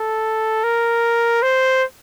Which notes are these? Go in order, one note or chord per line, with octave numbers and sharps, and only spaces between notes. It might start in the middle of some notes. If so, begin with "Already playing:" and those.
Already playing: A4
A#4
C5